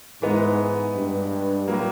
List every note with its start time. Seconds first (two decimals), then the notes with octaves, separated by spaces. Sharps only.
0.22 G#2 E3 G#3 B3 D#4
0.95 G2
1.68 A2 F#3 A#3